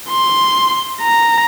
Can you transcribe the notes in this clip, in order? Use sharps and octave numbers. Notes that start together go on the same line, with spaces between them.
C6
A#5